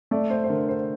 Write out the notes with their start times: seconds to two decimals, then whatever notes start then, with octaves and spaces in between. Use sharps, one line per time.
0.11 A3 D5
0.30 C5
0.44 C5
0.49 D3 A#4
0.69 C5